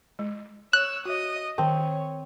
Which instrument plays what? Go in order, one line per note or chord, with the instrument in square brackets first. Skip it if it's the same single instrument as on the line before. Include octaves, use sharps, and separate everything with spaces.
[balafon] G#3
[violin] C#5 E6 [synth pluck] F#6
[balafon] F#4 [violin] D#5 D#6
[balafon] D#3 [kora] C4 [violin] C#5